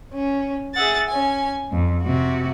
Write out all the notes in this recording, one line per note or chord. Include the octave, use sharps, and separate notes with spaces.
C#4
G#4 E5 F#5 A6
C#4 G#5
F2
C3 F#4